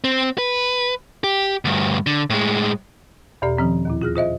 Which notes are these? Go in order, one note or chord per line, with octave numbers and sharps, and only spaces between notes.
C4
B4
G4
D2 G2
D3
A2 G#3
E2 B2 G4 D5 A#5
D#3 F3 C4 C#4
D#2 A#2 E4
F4 G#4 F6 A#6
F4 C5 D#5 E5